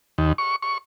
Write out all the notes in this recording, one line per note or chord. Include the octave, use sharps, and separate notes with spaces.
D#2
C#6
C#6